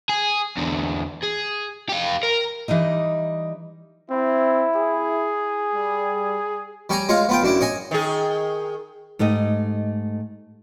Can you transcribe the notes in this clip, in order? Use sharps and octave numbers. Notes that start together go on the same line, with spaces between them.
G#4
E2 D3
G#4
G4 F5
A#4
E3 G3 D#4 D#5
C4 E4
G#4
G3
G3 C#5 G#5 A#5
G#3 F4 C#5 A#5
B3 F4 G5
F#2 D4 E4
C#5 D#5 G#5
D#3 G#4
G#2 A3 G4 D#5